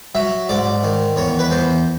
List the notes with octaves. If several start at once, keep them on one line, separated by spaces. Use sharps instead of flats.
F#3 E5
G#2 D5
D#3
E2 C#5
B4
E2 C5